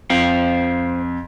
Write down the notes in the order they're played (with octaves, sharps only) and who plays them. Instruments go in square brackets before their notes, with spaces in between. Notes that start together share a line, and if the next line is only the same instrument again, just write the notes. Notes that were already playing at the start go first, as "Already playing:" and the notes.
[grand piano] F2 [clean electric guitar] C5 F5 G5